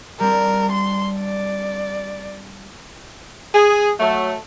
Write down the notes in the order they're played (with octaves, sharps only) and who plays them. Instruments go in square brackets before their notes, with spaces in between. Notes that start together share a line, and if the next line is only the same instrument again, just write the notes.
[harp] G3 C4 D4 [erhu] A#4
[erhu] C6
D5
[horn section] G#4
F#3 A3